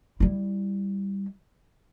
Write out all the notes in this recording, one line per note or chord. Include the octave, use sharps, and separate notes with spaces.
G3 E4